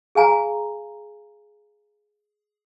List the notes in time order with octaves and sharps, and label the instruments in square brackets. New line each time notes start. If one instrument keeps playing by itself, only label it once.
[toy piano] G#4 F5 G#5 A#5